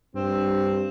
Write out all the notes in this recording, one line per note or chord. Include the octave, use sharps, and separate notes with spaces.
G2 C4